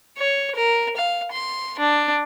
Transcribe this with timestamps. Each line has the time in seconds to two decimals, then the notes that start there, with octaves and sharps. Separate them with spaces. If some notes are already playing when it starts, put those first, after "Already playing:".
0.18 C#5
0.56 A#4
0.96 F5
1.32 C6
1.79 D4